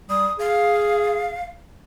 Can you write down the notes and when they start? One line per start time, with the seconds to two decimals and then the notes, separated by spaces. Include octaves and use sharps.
0.10 G3 D#6
0.39 G#4 F5